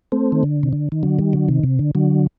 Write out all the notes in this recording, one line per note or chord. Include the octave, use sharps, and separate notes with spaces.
A3 C4
D#3
D3
C3
D3
D#3
D3 F#3
D#3 G3
D3 F#3
C3 D#3
C3
D3
D3 F#3